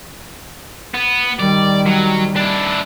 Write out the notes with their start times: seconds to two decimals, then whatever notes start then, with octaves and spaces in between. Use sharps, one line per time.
0.94 B3
1.39 D#3 G3 D5
1.86 F#3
2.36 D4 E4